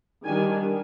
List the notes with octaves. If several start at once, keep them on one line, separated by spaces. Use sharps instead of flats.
D#3 G3 D4 G#5